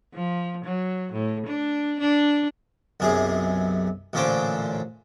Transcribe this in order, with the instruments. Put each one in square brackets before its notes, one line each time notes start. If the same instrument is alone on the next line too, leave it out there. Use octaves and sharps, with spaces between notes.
[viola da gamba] F3
F#3
A2
D4
D4
[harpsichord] B1 F#2 C3 G#4
A1 A#2 D3 C#4 C5 D6